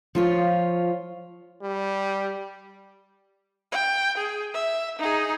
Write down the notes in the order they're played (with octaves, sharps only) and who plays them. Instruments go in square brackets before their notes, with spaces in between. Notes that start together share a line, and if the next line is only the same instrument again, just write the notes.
[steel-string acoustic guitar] F3 F4 C#5
[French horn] G3
[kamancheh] G5
G#4
E5
D#4 G#4